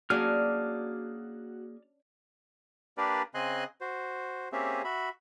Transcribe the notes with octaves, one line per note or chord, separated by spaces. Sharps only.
A#3 C#4 D4 F#4 G#4 D5 F6
A#3 D4 G4 A#4 B4 D5
C#3 C4 D#5 G#5 C6 F#6
F#4 C5
A#3 C4 C#4 G4 G#4 E5
F#4 E5 B5